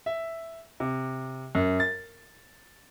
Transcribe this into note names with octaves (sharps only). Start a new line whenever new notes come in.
E5
C3
F#2
A6